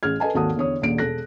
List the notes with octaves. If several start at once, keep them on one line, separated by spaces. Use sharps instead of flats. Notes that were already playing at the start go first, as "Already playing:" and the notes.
A1 G#4 F6 G#6
A4 B4 D#5 G#5 A5
G#1 D#2 F#4 A4 A5 D#6
E2 D3 C#5 D#6
D#1 A#1 D7
E1 G#4 A4 F#6 A#6